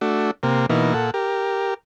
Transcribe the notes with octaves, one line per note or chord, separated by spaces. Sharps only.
A3 D4 F#4
C3 A#3
B2 E3 A#3 D#4
A#2 A4 F#5
G4 A#4